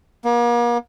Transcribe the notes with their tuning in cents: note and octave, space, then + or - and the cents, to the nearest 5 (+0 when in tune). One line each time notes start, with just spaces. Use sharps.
A#3 +40